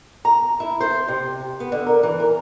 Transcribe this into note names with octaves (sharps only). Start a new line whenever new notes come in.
A#5
E4
C5
C3
B3
D3
A#4
E3
A#4